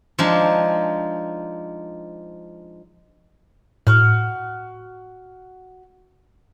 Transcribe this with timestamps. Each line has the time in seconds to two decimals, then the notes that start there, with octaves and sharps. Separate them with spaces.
0.19 F3 G#3 D4 D#4
3.87 A2 F#4 F6